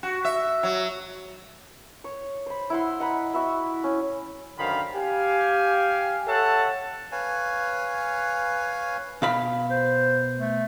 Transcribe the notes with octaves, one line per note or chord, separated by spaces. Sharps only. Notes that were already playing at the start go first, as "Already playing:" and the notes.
F#4
E5
F#3
C#5
C5 B5
E4 F#5 C6
D#5 F#5 A#5 B5
E4 F#4 E5 B5
C#4
F#2 D3 D#3 C5 F5 B5
G4 F5 G#5
A4 C#5 E5 F#5 A5
B4 C#5 F5 G#5
B2 F5 B5
C5
A3